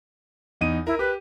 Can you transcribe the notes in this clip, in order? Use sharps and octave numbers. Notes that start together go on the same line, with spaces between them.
E2 D#4 D#7
E4 A#4
G4 B4